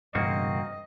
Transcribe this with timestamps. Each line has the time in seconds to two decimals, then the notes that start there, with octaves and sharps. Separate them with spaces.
0.15 E1 G2 C#3 A#3 C4 F#4 D#5